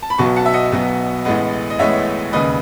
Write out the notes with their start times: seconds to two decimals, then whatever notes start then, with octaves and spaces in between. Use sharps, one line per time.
0.02 A5
0.10 B5
0.18 B1 B2 F#3 B3 A5 C#6
0.36 F#5 A5
0.46 E5
0.53 D#5 F#5
0.72 B1 B2 F#3 B3
1.25 A1 A2 G#3 B3
1.70 D#5
1.79 A1 A2 G#3 B3 C#5 E5
2.33 E1 D#2 C#3 B4 D#5